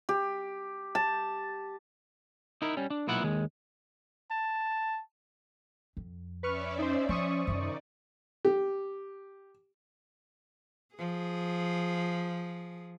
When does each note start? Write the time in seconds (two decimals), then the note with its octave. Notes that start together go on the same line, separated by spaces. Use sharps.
0.09 G4
0.95 A5
2.62 D#4 E4 A#4
2.77 G3 C#4
2.90 D4
3.07 B1 A#2 B3 E4 F#5
3.23 D#2 G#3
4.31 A5
5.97 F2
6.43 C#4 B4 D5 E5 C#6 F6
6.79 D#4 C5
7.09 F3 C5 C#6 D#6
7.47 F#2 C3 D#3 D#4 D5
8.45 G4
10.95 F3 G#4